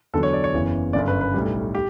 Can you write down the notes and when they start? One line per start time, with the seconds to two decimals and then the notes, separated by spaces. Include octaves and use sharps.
0.13 E2 D3 F#3 A4
0.23 C#5
0.33 D5
0.44 C#5
0.53 F#1 E2 C#3 E3
0.93 G1 F#2 C#3 D5
1.08 B4
1.21 B4
1.34 B1 A2 G3
1.75 G4